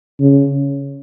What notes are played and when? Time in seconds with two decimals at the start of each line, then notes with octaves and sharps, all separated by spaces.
0.20 C#3